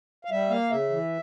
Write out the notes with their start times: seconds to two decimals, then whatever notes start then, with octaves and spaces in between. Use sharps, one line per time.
0.25 F5
0.31 G3 E5
0.50 A#3 F5
0.71 C#3 E5
0.90 E3